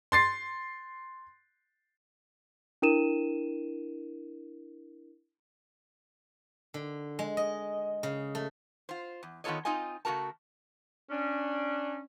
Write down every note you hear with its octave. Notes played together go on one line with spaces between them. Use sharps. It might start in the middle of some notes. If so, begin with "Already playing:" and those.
C6 A6 C7
D4 E4 A#4 D#7 E7
D3
G#3
D#5
C#3
A3
F4 C5
E2
D#3 B3 F4 A4 C#5 D#5
C4 D#4 F4 D#5 G#5
C#3 A3 F#4 A#4 A5
C#4 D4